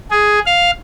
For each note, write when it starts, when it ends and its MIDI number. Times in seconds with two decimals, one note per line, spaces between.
0.11 0.39 68
0.46 0.71 77